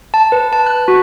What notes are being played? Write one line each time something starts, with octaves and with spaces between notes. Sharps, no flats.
A5
B4
A5
F#6
F#4